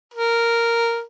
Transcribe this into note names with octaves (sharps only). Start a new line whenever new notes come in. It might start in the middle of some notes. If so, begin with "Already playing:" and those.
A#4